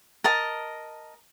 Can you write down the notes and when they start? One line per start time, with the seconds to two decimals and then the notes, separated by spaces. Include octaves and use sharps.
0.24 A#4 D#5 A5